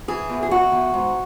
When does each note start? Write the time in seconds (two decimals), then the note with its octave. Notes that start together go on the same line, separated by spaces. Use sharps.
0.08 E3 G#4
0.29 E2
0.43 G#4
0.51 E2 F#4
0.72 E2
0.94 G#2